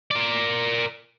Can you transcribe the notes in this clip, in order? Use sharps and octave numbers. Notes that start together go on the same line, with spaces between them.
A#4 D5